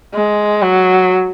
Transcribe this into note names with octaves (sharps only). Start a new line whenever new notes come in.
G#3
F#3